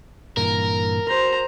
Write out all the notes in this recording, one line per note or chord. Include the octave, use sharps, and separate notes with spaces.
G2 A#2 E3 A#4
F#4 A#4 C5 A#5